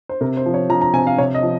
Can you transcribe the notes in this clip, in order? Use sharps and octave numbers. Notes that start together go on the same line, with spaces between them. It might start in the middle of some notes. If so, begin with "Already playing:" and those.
C5
C3 A#4
C5
F3
C#5
F3 A#5
A#5
C3 G#5
F5
C3 C#5
D#5
F3